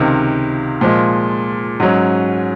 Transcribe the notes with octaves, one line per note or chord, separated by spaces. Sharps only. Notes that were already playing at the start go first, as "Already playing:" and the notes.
Already playing: C#2 C3 D#3
A#2 F3 G#3
G#2 F#3 C#4